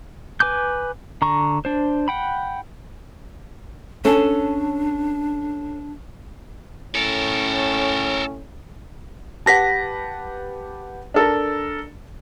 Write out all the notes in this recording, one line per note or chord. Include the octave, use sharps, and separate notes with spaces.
B4 G#5 D6 G6
D3 A#5 C#6
D4 C5
F#5 G5 B5
C#4 D4 A4
A2 C#4 A4 A#4
G4 B4 F#5 A5 A#6 B6
D4 A4 A#4